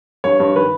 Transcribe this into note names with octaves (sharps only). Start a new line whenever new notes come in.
G2 C#5
G2
D#3 B4